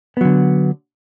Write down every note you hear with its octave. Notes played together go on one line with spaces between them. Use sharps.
D3 F#3 B3